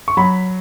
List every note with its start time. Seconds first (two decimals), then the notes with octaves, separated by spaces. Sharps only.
0.08 C#6
0.17 F#3 B5